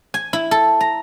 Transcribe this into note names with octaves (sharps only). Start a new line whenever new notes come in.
G#5
E4
A4
A#5